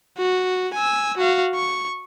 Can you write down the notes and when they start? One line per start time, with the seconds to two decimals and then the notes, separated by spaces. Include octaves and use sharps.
0.18 F#4
0.74 G#5 E6
1.18 F#4 F5
1.55 C#6